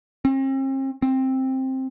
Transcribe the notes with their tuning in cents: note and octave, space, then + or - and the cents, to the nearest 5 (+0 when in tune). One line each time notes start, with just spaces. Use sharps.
C4 +45
C4 +10